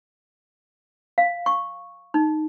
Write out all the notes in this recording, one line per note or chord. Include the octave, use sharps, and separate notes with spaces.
F5
C#6
D#4